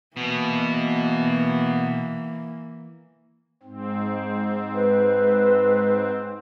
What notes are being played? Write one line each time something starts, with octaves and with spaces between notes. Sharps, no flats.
B2 E3 A#3 B3
G#2 C4
B4